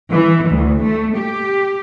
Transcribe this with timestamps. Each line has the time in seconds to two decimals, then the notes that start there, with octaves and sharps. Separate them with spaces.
0.11 E3
0.50 D2
0.82 A3
1.17 G4